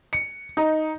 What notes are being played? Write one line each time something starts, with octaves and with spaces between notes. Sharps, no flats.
C#7
D#4